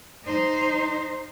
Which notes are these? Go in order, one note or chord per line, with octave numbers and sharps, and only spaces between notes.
D#4 C5